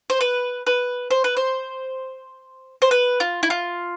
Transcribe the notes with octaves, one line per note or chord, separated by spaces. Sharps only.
C5
B4
B4
C5
B4
C5
C5
B4
F4
E4
F4